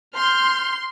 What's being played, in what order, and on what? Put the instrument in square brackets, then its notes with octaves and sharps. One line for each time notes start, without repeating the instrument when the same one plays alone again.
[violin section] C6 [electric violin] F6 G6